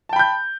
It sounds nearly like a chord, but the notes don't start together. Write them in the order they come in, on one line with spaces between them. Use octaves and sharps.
A5 G5 B5 G6